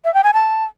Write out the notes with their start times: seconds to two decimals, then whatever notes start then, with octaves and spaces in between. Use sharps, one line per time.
0.04 E5
0.14 G5
0.24 G#5
0.33 A5